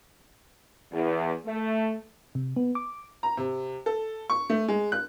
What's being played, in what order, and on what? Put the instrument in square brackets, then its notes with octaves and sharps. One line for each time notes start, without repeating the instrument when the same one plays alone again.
[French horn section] E2
A3
[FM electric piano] C3
B3
D6
[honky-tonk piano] A#5
C3
A4
C#6
A3
G#3
F#6